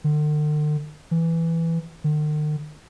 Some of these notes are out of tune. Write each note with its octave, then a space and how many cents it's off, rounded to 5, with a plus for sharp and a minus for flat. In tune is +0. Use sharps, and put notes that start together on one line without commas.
D3 +45
E3 +5
D#3 -45